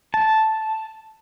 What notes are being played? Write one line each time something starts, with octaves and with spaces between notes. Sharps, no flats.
A5